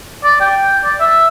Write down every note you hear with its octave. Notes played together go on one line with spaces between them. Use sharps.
D5
G5
D5
E5